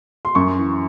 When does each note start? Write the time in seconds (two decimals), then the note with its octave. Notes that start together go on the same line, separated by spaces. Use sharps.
0.25 C6
0.35 F#2 C#6
0.58 E3